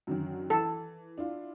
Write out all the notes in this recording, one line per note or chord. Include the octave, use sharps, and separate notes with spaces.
F#2 D3 D#3
E3 A4
D4 E4 F4